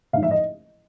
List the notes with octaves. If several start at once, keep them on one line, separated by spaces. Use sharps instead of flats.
A1 G#2 F3 F5
E5
D#5